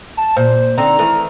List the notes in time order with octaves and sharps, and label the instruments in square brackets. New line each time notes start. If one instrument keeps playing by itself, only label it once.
[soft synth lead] A5
[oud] A#2 [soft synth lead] C5
[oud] D3 C4 D#4 [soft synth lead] A#5
[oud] D#3 E3 A3